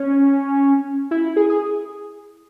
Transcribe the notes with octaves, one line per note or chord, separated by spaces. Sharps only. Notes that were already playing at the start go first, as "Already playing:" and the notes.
Already playing: C#4
E4
G#4
G#4